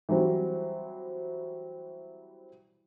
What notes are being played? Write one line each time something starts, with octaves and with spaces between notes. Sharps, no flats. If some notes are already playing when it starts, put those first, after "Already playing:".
E3 F#3 G3 C4